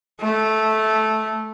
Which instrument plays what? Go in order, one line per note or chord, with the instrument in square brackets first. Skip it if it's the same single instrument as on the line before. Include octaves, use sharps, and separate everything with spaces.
[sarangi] A3